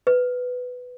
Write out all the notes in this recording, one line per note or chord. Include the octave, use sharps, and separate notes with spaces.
B4